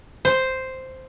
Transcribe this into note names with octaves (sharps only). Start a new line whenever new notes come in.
C5